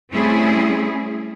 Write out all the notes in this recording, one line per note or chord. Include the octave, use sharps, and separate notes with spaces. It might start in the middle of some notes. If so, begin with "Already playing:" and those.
G3 A3 C4 C#4 E4 G#4